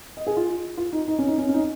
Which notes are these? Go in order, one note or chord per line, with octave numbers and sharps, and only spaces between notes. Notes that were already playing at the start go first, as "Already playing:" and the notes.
D#5
G#4
F4
F4
D#4
D#4
C#4
D#4
C#4
C#4
D#4